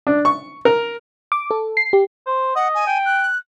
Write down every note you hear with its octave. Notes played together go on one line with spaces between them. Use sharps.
D4
C#6
A#4
D6
A4
C7
G4
C5
D#5 F#5
G#5
G5
F#6